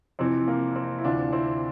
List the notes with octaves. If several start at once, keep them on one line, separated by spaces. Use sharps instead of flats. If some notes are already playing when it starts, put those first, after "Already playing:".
F2 C3 E3 C4
A#3
C4
E4
D2 C3 E3 D4 F4
C4 E4